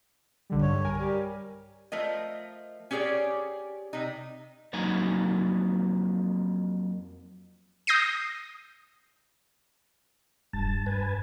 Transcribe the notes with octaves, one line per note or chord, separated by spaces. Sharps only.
B1 D3 G3
G2 C#5
A#4 G#5
G3
F3 A3 A#4 D#5
C#4 G4 G#4 C#5 D5
C3 D#4
F2 F#3 A#3 D#4 G#5
D#6 G6 A#6 C7 D#7
E1 G2 A5
G2 B4 G#5 A5